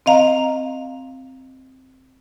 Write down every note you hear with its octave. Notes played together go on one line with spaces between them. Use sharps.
C4 D#5 F5 A#5